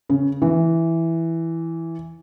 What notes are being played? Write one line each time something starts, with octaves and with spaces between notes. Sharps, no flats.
C#3
E3